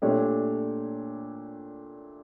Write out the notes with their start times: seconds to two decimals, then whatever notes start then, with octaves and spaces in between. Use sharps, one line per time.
0.02 A#2 A3 D4 G4 C#5